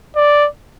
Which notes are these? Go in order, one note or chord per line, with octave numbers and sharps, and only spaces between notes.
D5